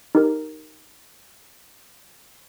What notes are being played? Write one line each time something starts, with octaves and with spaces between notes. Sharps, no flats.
D#4 G4 A#4